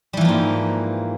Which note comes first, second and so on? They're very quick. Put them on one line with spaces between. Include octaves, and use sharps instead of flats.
G3 E3 F3 A#3 G#2